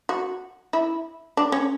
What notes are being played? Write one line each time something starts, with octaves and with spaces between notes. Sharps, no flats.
F#4
E4
D4
C#4